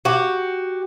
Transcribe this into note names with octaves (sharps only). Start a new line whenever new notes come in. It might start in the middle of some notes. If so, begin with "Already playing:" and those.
F#4 G4